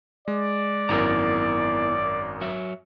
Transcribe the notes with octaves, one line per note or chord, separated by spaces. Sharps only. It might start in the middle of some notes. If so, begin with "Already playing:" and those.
G#3 D5
G#1 F#2 B3 E4 A#4 A#5
F#3 E5